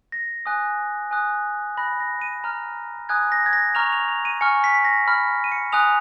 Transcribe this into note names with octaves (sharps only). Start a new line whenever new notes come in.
A#6
G#5 D#6 F#6
G#5 D#6 F#6
B5 F#6 A#6
A#6
D#7
A#5 F6
G#5 D#6 F#6 G#6
A#6
G#6
A#6
A#5 C#6 F6 F7
F7
F7
D#7
G#5 C#6 F6 C#7
B6
A#6
B5 F6
D#7
C#7
G#5 D#6 F#6 F7